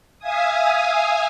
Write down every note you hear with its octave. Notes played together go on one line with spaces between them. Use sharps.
E5 F5 G#5 D#6